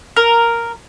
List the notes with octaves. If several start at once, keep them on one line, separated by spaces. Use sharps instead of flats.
A#4